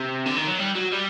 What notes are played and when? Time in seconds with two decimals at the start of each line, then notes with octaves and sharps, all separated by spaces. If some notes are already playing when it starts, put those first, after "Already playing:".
Already playing: C3
0.26 D3
0.36 D#3
0.48 F#3
0.59 G3
0.76 F#3
0.93 G3